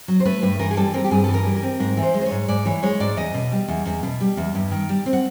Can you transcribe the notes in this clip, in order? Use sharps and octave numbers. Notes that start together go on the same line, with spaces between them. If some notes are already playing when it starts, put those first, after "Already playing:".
F#3
C5
A3 B4
G2 B4
E3 A#4
G#4
G3 A4
C4 A#4
G4
G2 G#4
A4
E3
A#4
G3
A#4
C4
G#2 A#4
E3
C5
G#3
C5
C#5
G#2
G#2 D5
E3 C#5
G#3 C#5
G#2 D5
E2 D#5
B2
G3
E2
E2
B2
G3
E2
G2
D#3
G3
C4
F#5